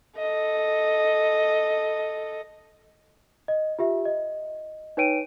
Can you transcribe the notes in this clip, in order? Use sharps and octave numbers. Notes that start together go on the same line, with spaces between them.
A4 D#5
D#5
F4 G4 E5
D#5
D#4 B4 C#5 G5 D7 D#7